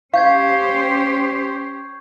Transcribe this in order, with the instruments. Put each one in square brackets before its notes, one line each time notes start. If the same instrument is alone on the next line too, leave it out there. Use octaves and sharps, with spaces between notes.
[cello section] C#4 G4 C5 [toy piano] F5 [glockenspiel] C#6 G6 G#6